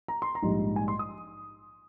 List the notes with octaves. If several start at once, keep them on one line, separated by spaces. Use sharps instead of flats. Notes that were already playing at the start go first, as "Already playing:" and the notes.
A#5
C6
A#5
A#1 G#2 G3
G#5
C6
D#6